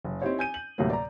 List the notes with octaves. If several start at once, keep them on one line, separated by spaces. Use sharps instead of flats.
F#1
C4 D#4 E4 G4 C5 C#5
G#5 G6 D#7
F#7
D2 A2 C3 F#3 G3 A#3
D5 A#5